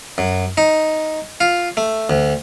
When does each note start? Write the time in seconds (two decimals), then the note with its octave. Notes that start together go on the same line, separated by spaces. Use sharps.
0.18 F#2
0.57 D#4
1.40 F4
1.77 A3
2.10 D2